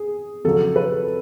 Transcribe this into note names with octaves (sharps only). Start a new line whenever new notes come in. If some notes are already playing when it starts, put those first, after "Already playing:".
Already playing: G#4
F2 C#3 F#3 A4
B4